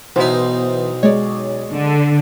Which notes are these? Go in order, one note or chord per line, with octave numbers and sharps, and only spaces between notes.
B1 E3 B3 D#4 E4 C5
G#3 C#5 D5
D3